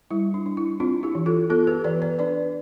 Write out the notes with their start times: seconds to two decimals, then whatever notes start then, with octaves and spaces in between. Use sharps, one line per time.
0.11 G3 E4
0.34 D4
0.46 D4
0.57 E4
0.80 C4 D4 F4
1.03 E4 G4
1.15 E3
1.26 F4 A4
1.50 B3 F4 A4
1.67 G4 B4
1.84 E3 B4 D5
2.02 B4 D5
2.19 D4 B4 D5